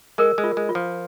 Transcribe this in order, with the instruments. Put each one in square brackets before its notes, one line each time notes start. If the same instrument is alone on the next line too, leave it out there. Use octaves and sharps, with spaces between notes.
[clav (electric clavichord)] G#3 [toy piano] A#4
[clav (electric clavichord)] G#3
[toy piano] F4
[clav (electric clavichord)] G#3
[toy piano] F4
[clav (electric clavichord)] F3